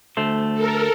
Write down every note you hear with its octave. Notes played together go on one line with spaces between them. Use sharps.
D2 A3 C5
A4 A#4